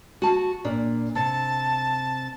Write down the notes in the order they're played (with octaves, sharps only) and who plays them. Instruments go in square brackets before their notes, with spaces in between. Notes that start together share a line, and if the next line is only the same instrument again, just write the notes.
[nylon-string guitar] F#4 A5
A#2 D4
[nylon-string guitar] C3 [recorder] A5